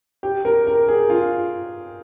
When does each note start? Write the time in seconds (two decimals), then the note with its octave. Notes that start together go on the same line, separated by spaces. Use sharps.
0.23 G4
0.45 A#4
0.67 A#4
0.88 G#4
1.10 F4